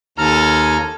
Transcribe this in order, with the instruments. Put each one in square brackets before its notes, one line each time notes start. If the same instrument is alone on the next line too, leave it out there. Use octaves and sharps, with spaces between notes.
[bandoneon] D#2 A#5 F6 [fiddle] A4 G#5